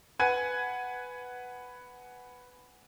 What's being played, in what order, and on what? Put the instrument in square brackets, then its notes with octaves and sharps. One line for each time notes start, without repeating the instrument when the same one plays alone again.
[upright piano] B4 F#5 G#5 G#6 D#7